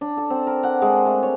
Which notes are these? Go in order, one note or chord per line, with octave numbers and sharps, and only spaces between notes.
D4
A4
C4
A#4
F#5
G#3
A3
C#5